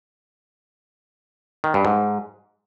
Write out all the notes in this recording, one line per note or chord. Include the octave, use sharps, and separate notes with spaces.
D#3
G2
G#2